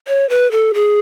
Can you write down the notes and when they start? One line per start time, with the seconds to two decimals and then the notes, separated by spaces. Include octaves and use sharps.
0.08 C#5
0.30 B4
0.52 A4
0.74 G#4